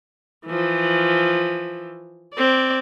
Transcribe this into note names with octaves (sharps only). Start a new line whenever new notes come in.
E3 F3
C4 D5